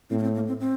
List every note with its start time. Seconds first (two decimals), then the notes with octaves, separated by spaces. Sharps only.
0.10 A2 C4
0.18 A#3
0.23 C4
0.35 A#3
0.48 C4
0.60 C4